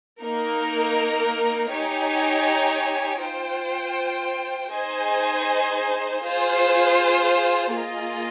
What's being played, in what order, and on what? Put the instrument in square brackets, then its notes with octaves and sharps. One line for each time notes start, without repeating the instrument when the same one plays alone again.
[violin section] A#3 D#4 A#4
D#4 G4 C#5 G#5
F4 C5 G5
D#4 G#4 C5 D#5 G#5
F4 G#4 C5
A#3 F4 G#4 D#5